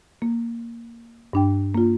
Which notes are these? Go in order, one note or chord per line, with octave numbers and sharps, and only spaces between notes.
A#3
G2 D4 G5
A#3 F4